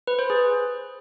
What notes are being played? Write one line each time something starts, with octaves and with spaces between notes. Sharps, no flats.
B4
C5
G#4